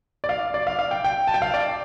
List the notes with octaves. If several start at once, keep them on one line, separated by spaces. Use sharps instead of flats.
D5
F5
D5
F5
F5
G5
G5
A5
G5
F5
D5